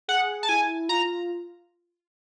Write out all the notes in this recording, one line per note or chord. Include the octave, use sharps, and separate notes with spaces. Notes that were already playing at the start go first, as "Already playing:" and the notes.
G#4 F#5
A5
E4 G#5
F4 A#5